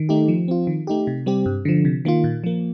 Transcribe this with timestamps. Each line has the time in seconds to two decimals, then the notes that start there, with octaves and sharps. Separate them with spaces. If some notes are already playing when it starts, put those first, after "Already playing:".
Already playing: D#3
0.09 A3 D#4 G4
0.28 F3
0.48 C4 F4
0.67 D#3
0.87 A3 D#4 G4
1.07 C3
1.26 G3 C4 G4
1.46 G2
1.65 D3 F3
1.85 C3
2.05 D#3 A#3 F4
2.24 A#2
2.44 F3 A#3